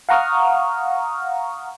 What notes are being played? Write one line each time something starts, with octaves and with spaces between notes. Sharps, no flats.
F5 F#5 A#5 C#6 D#6 F6